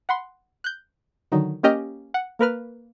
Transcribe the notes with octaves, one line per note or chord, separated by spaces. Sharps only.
F#5 B5 C6
F#6 G6
D3 D#3 F#3 D#4
A#3 C#4 G4 D#5 F6 G6
F#5
A#3 A#4 B4 F6